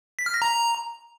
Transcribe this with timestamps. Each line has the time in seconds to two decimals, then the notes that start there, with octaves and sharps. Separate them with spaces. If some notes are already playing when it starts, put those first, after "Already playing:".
0.19 B6
0.26 F6
0.34 A#6
0.42 A#5